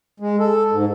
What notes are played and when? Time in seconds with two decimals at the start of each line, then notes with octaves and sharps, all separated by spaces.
0.20 G#3
0.40 A4
0.72 G#2